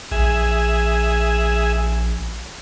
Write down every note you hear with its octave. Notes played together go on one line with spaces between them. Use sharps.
A#1 G#4 E5